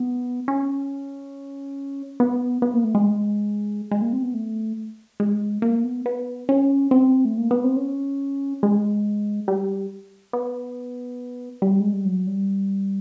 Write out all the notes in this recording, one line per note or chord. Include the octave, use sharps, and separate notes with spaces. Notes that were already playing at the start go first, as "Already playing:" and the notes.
Already playing: B3
C#4
B3
B3
A#3
A3
G#3
G#3
A#3
C4
B3
A3
G#3
A#3
B3
B3
C#4
C4
A3
A#3
B3
C4
C#4
G#3
G3
B3
G3
G#3
G3
F#3
G3